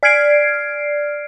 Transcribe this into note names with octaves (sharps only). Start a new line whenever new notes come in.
D5 F6 G#6 C7 D7